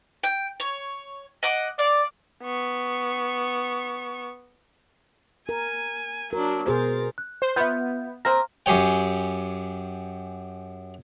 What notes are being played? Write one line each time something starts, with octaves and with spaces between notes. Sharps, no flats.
G5
C#5
D#5 F#5 D6
D5 F5
B3 C#6
A#4 G#5
F#3 D4 A#4
B2 G#4 A#4 C5 A6
F#6
C5
B3 F4 E5 G6
A#3 C4 A#4 A#6
F#2 G4 G#4 C#5 G5